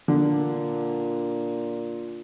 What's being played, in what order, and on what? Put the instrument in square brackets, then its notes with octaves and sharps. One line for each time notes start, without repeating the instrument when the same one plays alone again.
[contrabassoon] A#2 [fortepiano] D3